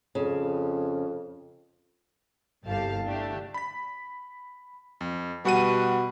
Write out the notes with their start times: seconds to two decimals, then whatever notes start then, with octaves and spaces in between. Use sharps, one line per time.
0.15 F2 C#3
2.65 G1 C2 G2 G4 F5 A5
3.03 D3 A3 D4 G4
3.54 B5 B6
5.01 F2
5.45 B2 G3 F#5 D#7